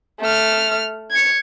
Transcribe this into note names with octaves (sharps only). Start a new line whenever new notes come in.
A3 F6
G#6 C#7